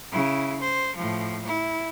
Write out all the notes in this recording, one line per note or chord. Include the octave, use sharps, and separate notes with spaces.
C#3 E4
C5
A2 F3
E4